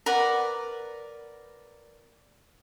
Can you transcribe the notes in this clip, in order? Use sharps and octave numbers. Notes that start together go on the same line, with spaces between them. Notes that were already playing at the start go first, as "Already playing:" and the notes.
A#4 B4 D5 F#5